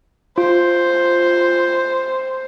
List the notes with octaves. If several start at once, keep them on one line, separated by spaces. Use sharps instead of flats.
F4 C5